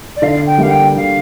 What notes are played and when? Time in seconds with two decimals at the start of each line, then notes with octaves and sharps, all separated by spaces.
0.16 D5
0.22 D3 F5
0.46 G5
0.58 G3 A#3 F5
0.70 G5
0.96 D3 F5